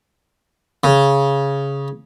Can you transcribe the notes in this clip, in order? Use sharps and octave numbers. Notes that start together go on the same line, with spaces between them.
C#3